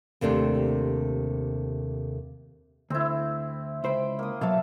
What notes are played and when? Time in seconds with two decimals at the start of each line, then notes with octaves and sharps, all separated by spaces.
0.21 D#2 C3 A3 D4 C5
2.90 D2 C4 E4
3.84 C#2 C5 G5 B5
4.19 A#3 D#6
4.41 B2 F#3 E5 F5 A5